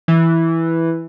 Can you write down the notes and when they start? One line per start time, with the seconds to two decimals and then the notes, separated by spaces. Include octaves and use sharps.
0.08 E3